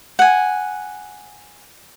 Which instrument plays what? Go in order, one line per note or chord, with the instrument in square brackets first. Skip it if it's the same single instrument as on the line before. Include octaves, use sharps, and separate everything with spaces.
[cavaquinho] F#5 G#5